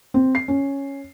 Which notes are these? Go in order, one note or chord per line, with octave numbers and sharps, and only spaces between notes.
C4
C7
C#4